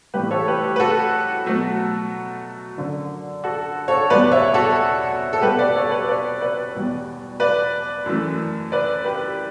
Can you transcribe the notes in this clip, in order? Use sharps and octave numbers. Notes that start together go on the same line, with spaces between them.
A2 E3 G3 G4 B4
A4 C#5
G4 B4
G4
B4
F#4 A4
B2 F#3 A3
F#2 D3 F#3
F#4 A4
A4 C#5
E2 B2 G3 B4 D5
C#5 E5
F#4 A4
A4
B2 G3 G4 B4
B4 D5
A4 C#5
G4 B4
B4 D5
B4 D5
E2 B2 G3
B4 D5
F#2 E3 A3
B4 D5
G4 B4